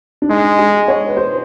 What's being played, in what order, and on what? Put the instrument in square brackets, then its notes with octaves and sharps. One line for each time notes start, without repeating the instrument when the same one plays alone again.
[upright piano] D4
[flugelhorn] G#3 [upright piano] D#4
[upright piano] G#4
C#5
B4
C5